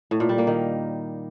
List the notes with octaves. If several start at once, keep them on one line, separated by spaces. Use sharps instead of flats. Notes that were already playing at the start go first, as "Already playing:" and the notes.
A2
A#2
G3
A#3
D#3